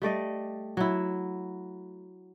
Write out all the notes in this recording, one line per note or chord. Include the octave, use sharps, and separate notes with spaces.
G3 A3 D5 D#5
F#3 E4